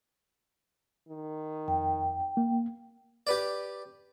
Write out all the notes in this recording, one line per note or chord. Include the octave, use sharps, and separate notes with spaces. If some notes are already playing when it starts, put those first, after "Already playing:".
D#3
F2 G5
A#3
G4 B4 D5